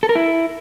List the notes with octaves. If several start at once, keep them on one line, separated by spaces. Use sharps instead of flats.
A4
A#4
E4